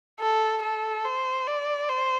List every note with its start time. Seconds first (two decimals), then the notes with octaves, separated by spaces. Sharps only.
0.20 A4
0.62 A4
1.05 C5
1.47 D5
1.89 C5